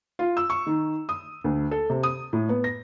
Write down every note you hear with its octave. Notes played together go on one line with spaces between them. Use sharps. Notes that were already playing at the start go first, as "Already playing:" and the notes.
F4
E6
C#6
D#3
D#6
D2
A4
C3
D#6
A2
B3
A#6